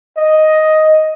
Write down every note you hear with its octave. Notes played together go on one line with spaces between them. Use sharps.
D#5